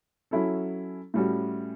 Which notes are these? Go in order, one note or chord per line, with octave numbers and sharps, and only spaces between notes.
F#3 C#4 E4 A4
A2 G3 C#4 F#4